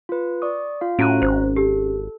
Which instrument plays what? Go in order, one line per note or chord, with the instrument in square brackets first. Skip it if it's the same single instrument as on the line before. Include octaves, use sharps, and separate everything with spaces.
[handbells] F4 B4
D5 C#6 D#6
F4 F5
[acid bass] A2 [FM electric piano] C#4 [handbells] F#4 A#5 F#6 [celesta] D7 D#7
[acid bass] G#1 [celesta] C5
[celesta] G4 [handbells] A4